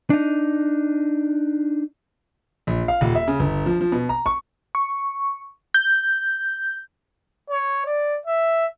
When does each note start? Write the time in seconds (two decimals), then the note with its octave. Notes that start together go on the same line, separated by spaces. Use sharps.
0.10 D4 D#4
2.67 A#1
2.88 F5
3.01 D#1
3.15 E5
3.28 C#3
3.39 G1
3.66 F3
3.81 F3
3.92 B2
4.09 A#5
4.26 C#6
4.75 C#6
5.74 G6
7.50 C#5
7.86 D5
8.26 E5